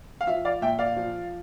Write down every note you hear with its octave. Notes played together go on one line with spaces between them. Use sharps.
F5
F3 E5
D5 F5
A#2 E5 G5
D5 F5
F3